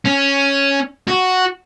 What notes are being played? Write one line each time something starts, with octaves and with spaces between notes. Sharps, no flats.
C#4
F#4